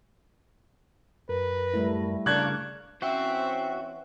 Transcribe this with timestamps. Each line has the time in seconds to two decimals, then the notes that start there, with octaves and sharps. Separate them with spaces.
1.29 F#2 A#4 B4
1.74 G3 A3 E4
2.26 C#3 D4 A#4 F5 C#6 D6 F#6 G#6
3.02 E3 C4 C#4 F#4 C5 E5 G5